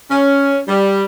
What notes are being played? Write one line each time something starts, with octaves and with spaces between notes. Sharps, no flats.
C#4
G3